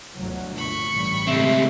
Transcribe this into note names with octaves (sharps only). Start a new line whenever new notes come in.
G1 D2 F#3
A#2 B5 C#6
A1 G3
C#2 G#3 A3 C4 G4 E5